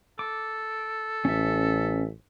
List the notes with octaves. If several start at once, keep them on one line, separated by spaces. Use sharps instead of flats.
A4 D6
A1 C#4 E5